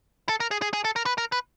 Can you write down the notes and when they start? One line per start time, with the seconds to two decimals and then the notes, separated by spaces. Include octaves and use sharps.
0.29 A4
0.40 A#4
0.51 G#4
0.62 G#4
0.73 G#4
0.84 A4
0.96 A#4
1.06 B4
1.18 A#4
1.32 B4